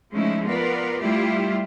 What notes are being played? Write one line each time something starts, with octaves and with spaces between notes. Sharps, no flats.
F3 G#3 A3 C#4 D#4 E4
B3 F4 A#4 B4 D5
G3 A3 E4 F4 G4